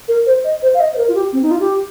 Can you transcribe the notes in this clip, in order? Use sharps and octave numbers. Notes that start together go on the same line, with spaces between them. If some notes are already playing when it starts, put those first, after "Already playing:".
A#4
C5
D#5
C5
F5
D#5
C5
A#4
F4
G4
C4
D#4
F4
G4